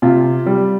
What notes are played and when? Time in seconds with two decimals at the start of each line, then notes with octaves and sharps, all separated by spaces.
0.02 C3 F4
0.46 G3